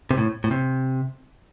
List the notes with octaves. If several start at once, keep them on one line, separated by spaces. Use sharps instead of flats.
C3
A2
A2
C3